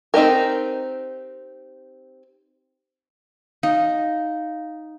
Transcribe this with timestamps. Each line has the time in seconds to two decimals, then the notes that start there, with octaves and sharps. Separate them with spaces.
0.14 C4 D#4 G4 A#4
3.63 D#4 F5